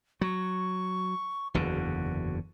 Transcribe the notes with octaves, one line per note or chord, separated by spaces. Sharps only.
F#3 C#6
F#1 E2 D3 F#4